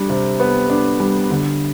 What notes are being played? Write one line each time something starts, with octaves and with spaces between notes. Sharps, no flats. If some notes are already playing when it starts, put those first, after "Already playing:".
Already playing: G3 D4
C3
B3
D4
G3
D3